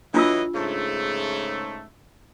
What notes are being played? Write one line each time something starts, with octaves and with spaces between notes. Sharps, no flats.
E3 F#3 D4 F4 D#5 E6
G#2 C#3 A3